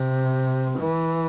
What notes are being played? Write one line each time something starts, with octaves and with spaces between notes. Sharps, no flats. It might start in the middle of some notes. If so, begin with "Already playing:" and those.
Already playing: C3
E3